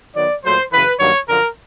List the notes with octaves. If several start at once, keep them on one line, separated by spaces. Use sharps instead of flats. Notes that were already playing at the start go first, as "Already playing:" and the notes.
D#3 F#3 B3 D5
A#2 F#3 A3 C5
F#2 C#3 E3 B4
G2 D#3 F#3 A#3 C#5
F#2 D3 F3 A#4